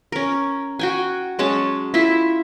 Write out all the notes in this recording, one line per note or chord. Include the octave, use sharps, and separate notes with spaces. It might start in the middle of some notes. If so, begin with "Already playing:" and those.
C#4 A#4
F#4 G5 G#5
F#3 G#3 C#4 A5
E4 F4 E5